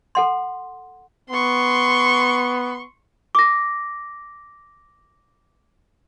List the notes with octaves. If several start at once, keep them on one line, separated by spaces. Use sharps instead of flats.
A4 F#5 C6
B3 C6 C#6
D6 A#6